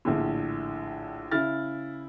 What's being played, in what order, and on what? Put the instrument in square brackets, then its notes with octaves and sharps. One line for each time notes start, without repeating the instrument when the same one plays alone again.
[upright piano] A#1 A2 D3
C#3 E4 F6 A6